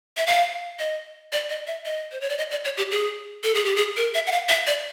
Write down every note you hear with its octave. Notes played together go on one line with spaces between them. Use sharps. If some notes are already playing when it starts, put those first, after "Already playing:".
E5
F5
D#5
D5
D#5
E5
D#5
C5
C#5
D5
D#5
D5
C#5
G4
G#4
A4
G#4
G4
G#4
A#4
E5
F#5
F5
E5
D5